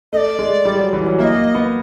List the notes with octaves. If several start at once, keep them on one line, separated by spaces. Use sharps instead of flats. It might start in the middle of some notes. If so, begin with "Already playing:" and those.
A3 D5 D#5
G#3
G3
F#3
E3
F#3
A#3 D#5 E5
A#3
B3